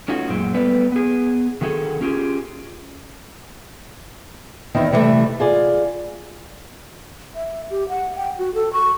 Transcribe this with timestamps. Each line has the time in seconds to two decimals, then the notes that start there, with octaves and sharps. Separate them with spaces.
0.08 A3 C#4 D#4 F4 F#4
0.29 F#2 A#2 G#3 C4
0.54 G3 A3 B3 B4 D5
0.92 B3 G#4
1.61 D3 D#3 F#4 G#4 A4
2.01 C#4 F4 G4 G#4
4.75 E2 D#3 C4 D#4
4.93 C3 E3 F#3 G3 A3
5.40 F4 G#4 D5
7.35 E5
7.70 G4
7.89 F#5
8.17 G5
8.38 F#4
8.54 A4
8.73 C#6